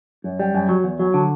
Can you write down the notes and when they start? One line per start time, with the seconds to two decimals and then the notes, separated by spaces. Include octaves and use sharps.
0.24 F#2
0.39 G3
0.55 F#2
0.69 F#3
0.84 E2
0.99 F#3
1.14 D3